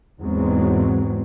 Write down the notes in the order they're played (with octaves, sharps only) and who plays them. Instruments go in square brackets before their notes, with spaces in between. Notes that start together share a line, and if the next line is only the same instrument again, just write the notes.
[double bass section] E2 G#2 F#3 G#3 B3 C4